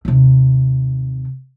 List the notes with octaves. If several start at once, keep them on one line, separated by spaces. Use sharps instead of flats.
D#2 C3